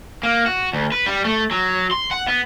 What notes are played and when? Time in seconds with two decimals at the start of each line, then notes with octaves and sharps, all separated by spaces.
0.23 A#3
0.46 F#4
0.73 D2
0.92 B4
1.06 G3
1.25 A3
1.51 F#3
1.91 C6
2.11 F#5
2.28 B3